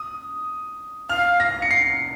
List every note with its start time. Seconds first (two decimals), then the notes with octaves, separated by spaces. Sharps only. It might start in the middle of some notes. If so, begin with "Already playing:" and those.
Already playing: D#6
1.10 F5 F6
1.40 A#6
1.62 C#7
1.71 C7